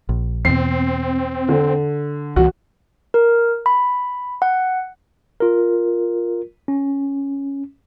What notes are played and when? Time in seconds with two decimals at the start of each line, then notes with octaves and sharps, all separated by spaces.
0.09 A#1
0.45 E2 B2 C4 C7
1.49 D3
2.36 C2 A#2 E3 F#4
3.14 A#4
3.66 B5
4.42 F#5
5.40 F4 A#4
6.68 C#4